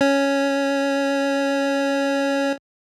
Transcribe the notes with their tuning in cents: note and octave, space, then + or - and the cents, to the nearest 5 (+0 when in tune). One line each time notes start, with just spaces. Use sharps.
C#4 +0 C#5 +0